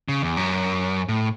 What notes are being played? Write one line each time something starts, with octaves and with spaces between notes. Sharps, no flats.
C#3
E2
F#2
A2